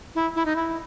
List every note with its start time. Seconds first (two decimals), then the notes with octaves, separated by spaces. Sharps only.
0.15 E4
0.36 E4
0.46 D#4
0.56 E4